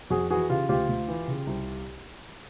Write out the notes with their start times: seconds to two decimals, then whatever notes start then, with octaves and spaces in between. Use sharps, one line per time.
0.10 F2 F#4 G#4
0.30 E3 F#4 G#4
0.49 C#3 F4 G4
0.69 D2 F4 G4
0.89 D2
1.08 E3
1.27 C#3
1.47 C2